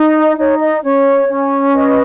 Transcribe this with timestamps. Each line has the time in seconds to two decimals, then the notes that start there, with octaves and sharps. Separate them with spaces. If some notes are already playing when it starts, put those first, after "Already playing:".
Already playing: D#4
0.15 D#5
0.38 D#4 C#5
0.61 D#5
0.83 C#4 C#5
1.28 C#4
1.74 B4 D#5